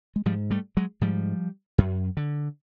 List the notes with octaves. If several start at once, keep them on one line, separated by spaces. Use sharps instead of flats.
G#3
G#2 F3 G3
G3 A3
F#3 G#3
G#2 F3 G3
F#2
D3